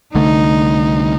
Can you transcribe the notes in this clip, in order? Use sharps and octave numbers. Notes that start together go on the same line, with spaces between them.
C2 D3 A3 D#4